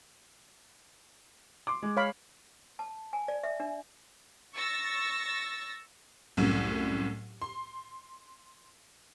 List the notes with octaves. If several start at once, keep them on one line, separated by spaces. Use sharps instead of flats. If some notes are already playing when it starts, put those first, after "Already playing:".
C6 D6
G#3
C#5 F5 B5
A5
G#5
D5
E5
D4
C#6 E6 A6 A#6
C2 F#2 A2
C6